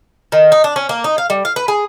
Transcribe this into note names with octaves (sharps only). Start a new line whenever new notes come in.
D#3
D#4
D4
C#4
A#3
D#4
F5
G3
F5
B4
G#4